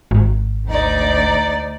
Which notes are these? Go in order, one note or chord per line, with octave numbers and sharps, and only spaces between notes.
G#1
D2 D#4 D5